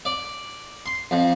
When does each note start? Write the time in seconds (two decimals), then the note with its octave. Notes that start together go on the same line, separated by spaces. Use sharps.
0.05 D5
0.86 C6
1.11 F2